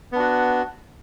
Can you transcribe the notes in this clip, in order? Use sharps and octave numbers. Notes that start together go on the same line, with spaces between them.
B3 D4 F#4